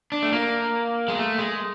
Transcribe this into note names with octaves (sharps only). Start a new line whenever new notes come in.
D4
A3
A#3
G#3
A3
G#3